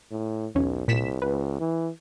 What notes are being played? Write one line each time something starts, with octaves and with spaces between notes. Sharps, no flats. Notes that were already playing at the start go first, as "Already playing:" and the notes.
A2
B1 E2 C#4
C2 A#2 B6 E7
C#2 B4
E3